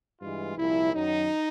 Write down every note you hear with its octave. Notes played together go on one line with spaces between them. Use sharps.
G2 E3 G#3 F4
C2 A#2 F3 E4
F#2 D#3 F#3 D#4